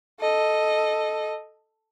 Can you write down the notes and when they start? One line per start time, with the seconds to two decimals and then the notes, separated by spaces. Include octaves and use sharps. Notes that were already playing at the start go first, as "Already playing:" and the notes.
0.20 A4 D#5